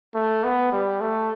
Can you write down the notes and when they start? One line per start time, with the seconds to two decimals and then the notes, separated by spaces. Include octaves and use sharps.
0.15 A3
0.44 B3
0.72 G3
1.01 A3